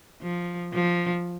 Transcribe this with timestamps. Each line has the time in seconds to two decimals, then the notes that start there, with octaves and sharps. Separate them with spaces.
0.22 F3
0.73 F3